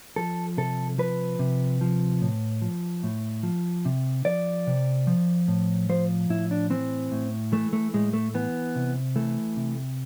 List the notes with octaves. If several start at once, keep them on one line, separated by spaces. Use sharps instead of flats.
F3 A4
C3 A4
F3 B4
C3
F3
A2
F3
A2
F3
C3
F3 D5
C3
F3
A2
F3 C5
A2 E4
D4
E3 C4
A2
E3 A3
A3
A2 G#3
A3
E3 B3
C3
E3 A3
C3